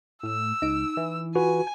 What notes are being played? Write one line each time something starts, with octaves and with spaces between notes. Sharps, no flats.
A2 E6
C#2 D#4 D7
E3
F4 F#4 B4 G#5